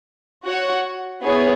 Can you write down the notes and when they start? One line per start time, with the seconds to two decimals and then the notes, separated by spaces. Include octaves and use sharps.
0.45 F#4 C#5 F#5
1.22 B3 E4 G#4 C#5